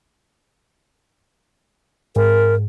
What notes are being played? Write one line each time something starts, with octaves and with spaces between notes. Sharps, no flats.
G#2 A#4